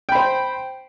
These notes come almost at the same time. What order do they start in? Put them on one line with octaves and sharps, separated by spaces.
G5 B5 C5